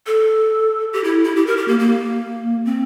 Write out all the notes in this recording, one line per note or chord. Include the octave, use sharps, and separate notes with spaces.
A4
G4
E4
E4
G4
A#4
G4
A#3
A#3
C4